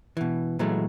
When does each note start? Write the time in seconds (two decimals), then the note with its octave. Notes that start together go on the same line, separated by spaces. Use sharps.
0.17 B2 E3
0.59 A#2 E3 F#3 G#3 A3